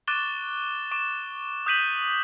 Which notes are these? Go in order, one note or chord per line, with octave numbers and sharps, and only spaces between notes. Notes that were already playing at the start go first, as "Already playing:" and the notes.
C#6 D6 F#6 A6 E7 G7
C#6 D6 E7
D#6 F#6 G6 B6 D#7 F#7